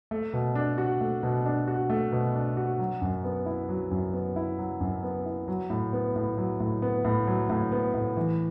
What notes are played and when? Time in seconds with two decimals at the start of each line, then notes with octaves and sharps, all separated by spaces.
0.11 A3
0.33 B2
0.55 D4
0.78 F#4
1.00 A3
1.23 B2
1.46 D4
1.68 F#4
1.90 A3
2.12 B2
2.35 D4
2.57 F#4
2.79 F#3
3.02 F#2
3.24 B3
3.46 E4
3.69 F#3
3.91 F#2
4.13 B3
4.36 E4
4.58 F#3
4.80 F#2
5.03 B3
5.26 E4
5.48 F#3
5.70 A2
5.93 B3
6.16 A2
6.38 F#3
6.60 A2
6.82 B3
7.05 A2
7.27 F#3
7.50 A2
7.72 B3
7.94 A2
8.17 E3